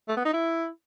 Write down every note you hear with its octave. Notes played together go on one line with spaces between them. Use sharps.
A3
B3
D#4
E4